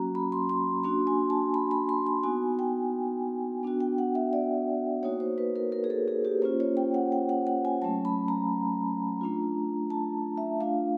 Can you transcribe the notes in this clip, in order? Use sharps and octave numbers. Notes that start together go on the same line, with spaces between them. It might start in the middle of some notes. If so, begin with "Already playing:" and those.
Already playing: F#3 A#3 C#4 F#4 A#5
B5
C6
C6
A#3 D4 F#4 C6
G#5
A5
B5
B5
C6
C6
B3 D#4 F#4 G#5
G5
B3 D4 F#4
G5
F#5
E5
D5
A#3 D#4 F#4 C#5
C5
B4
A#4
A#4
G#4
A4
G#4
G4
A#3 C#4 F4 C5
C#5
G5
F#5
G5
F#5
F#5
G#5
F#3 A3 C#4 A5
B5
A#5
A3 D4 F4
A5
E5
A3 D4 F4 F5